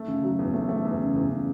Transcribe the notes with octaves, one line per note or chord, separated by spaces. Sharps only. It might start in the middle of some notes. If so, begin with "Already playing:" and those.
Already playing: A3
C#3
F#3
E2
A3
A3
E2
C#3
E2
C#3